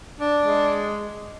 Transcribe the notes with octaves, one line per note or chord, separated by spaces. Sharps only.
D4
G#3